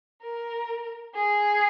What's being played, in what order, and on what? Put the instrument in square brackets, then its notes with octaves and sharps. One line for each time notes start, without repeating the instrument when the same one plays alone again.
[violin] A#4
G#4